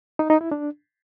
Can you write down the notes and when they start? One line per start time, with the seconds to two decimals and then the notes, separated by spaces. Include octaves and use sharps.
0.19 D#4
0.30 D#4
0.41 E4
0.51 D4